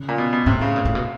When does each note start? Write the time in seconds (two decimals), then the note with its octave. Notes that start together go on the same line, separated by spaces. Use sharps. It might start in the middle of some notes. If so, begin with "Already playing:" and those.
Already playing: C#3
0.09 A#2
0.18 B2
0.33 B2
0.46 A2 C3
0.61 C#3
0.76 A#2
0.85 A2
0.95 B2